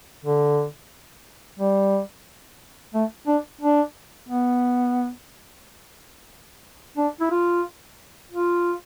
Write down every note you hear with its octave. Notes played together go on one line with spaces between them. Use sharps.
D3
G3
A3
D4
D4
B3
D4
E4
F4
F4